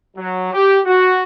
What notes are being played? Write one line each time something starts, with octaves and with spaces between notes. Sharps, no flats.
F#3
G4
F#4